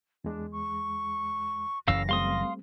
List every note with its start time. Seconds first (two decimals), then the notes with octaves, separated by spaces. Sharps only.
0.24 E2 G#3 D4
0.52 C#6
1.88 F#1 F#2 C#3 E3 F5 E6 A#6
2.09 G3 A3 C4 F5 C6 D#6